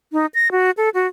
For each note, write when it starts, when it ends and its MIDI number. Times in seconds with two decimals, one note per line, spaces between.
0.13 0.26 63
0.34 0.51 94
0.52 0.71 66
0.77 0.89 69
0.94 1.07 66